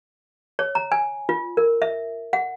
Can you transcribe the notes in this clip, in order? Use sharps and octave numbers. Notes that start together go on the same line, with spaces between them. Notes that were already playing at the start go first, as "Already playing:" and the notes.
C#5
A#5
G#5
F4
A#4
E5
F#5